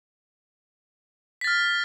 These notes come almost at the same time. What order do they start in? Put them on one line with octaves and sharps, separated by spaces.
B6 A6 F6